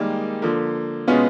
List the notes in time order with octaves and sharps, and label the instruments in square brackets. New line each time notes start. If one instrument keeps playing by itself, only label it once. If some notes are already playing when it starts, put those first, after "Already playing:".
Already playing: [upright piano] D#3 G3 A#3 D#4 [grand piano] G#3
[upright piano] D3 F3 A#3
[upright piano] B2 G#3 C#4 F4 [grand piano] B3